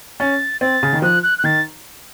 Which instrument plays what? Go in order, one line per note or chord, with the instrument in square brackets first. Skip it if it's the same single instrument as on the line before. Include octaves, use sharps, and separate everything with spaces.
[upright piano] C#4 [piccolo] A6
[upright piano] C4 [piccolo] A6
[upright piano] C#3
D#3
[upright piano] F3 [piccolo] F#6
[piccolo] F#6
F#6
[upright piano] D#3 [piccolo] A6